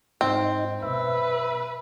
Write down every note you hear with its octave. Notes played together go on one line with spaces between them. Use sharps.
G#2 G#3 C4 D#4
F#2 B2 B4 E5